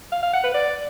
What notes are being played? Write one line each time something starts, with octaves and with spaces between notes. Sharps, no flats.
F5
F5
F#5
B4
D5